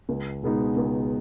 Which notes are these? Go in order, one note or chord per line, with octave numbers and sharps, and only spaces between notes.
C#2
B2 G#3 B3 D#4
C#2